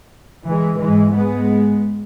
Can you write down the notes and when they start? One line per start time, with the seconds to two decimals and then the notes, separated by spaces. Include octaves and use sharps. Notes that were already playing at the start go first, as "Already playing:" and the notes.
0.45 E3 G#3
0.79 G#2 E3 G#3
1.13 G#3 B3